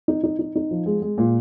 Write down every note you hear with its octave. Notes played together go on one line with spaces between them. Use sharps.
D#4
D#4
D#4
D#4
F3
G#3
G#3
A#2